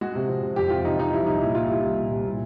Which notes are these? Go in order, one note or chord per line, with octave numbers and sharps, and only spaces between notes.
G#3 F#4
C3
F3
C3
F2 G4
C3 F4
C3 D#4
F3 D#4
G3 E4
C2 D#4
A#2 E4
A#2 F4
G3 E4
C2
A#2
C2
A#2